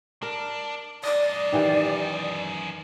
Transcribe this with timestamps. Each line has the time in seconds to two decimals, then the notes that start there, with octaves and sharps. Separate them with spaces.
0.22 D4 A#4
1.04 F#2 D5 D#5
1.52 D#3 E3 G4